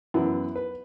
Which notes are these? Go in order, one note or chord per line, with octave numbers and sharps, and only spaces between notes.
F#2 E3 B3 E4
B4